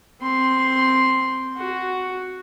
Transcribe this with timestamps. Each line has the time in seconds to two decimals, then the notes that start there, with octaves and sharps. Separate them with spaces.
0.22 C4 C6
1.57 F#4